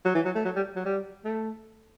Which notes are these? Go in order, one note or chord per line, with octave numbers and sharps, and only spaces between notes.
F#3
E3
F#3
A3
F#3
G3
F#3
G3
A3